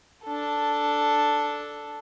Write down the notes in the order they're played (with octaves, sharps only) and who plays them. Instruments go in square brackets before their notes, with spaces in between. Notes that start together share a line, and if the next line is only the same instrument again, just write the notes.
[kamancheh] D4 A4